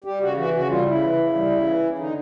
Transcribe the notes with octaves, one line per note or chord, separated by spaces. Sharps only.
G3 G4
C#3 F#4
E3 F#4
C#3 F#4
G3 F4
C#3 E4
E3
C#3
G3
C#3
E3
C#3
D3 D#4